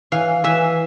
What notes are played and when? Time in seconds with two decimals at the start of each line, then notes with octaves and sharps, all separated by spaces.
0.12 E3 F5
0.44 E3 E5